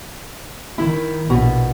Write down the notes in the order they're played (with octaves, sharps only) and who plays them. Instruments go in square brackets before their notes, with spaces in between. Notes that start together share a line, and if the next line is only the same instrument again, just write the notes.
[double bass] D#3 [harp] E4
[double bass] A#1 [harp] B2